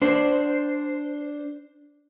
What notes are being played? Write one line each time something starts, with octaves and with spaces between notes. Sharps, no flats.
D4 C5